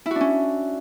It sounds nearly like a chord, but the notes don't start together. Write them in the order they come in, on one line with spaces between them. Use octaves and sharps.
E4 F#4 D4 C#4